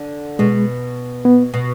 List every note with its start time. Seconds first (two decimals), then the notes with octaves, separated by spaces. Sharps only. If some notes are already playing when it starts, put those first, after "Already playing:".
Already playing: D3
0.39 B2 G#3
1.25 B3
1.54 B2